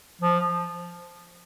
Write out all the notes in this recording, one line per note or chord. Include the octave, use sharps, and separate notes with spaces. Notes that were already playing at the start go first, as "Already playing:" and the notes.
F3